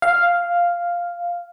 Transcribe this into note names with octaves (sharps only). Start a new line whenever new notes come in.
F5